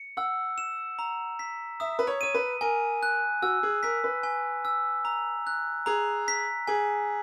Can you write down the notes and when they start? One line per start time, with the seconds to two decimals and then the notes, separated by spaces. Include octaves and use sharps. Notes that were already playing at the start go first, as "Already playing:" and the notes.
Already playing: C#7
0.17 F#5 E6
0.58 E7
0.99 A#5
1.39 B6
1.80 E5 D#6
1.99 B4
2.07 C#5
2.21 C#5 D#7
2.34 B4
2.61 A#4 G#5
3.03 F#6
3.42 F#4 E6
3.63 G#4
3.83 A#4 B6
4.04 B4
4.23 G#5
4.65 E6
5.05 A#5
5.47 F#6
5.86 G#4 A#5
6.28 B6
6.67 G#4 G#5